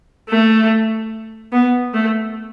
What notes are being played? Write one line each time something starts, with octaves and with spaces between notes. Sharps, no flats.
A3
B3
A3